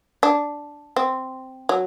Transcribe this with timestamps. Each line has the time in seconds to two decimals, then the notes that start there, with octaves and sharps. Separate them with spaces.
0.23 D4
0.96 C4
1.69 F#3